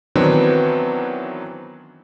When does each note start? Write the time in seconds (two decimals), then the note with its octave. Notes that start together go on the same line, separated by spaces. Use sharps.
0.16 D#3 E3 F#3 B3 C4 D4